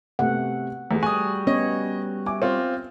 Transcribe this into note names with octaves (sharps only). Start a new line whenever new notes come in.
C3 A3 B3 F#5
E2 A3 G#4
G3 F#4 G#5 D#6
B3 C#4 C#5 D#5
E5 G#5 D6
C4 F4